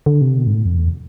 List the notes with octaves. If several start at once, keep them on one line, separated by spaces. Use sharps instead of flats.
D3
C3
B2
G#2
A2
F2
E2